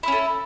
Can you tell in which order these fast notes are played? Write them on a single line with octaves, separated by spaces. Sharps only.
E4 C#4 A4